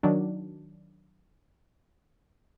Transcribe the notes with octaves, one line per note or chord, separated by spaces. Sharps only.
D#3 F#3 D4